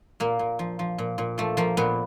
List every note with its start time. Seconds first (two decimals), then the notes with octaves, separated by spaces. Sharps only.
0.20 A#2 A#3
0.39 A#2
0.59 F3
0.79 F3
0.98 A#2
1.18 A#2
1.38 F3 A3
1.57 F3 A#3
1.77 A#2 B3